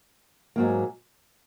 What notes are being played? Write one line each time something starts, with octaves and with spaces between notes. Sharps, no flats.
G#2 F#3 A#3